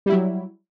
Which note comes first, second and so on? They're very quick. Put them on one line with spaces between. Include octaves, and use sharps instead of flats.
G3 E4 F#3